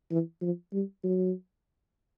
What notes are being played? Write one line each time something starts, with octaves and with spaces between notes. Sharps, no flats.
E3
F3
G3
F#3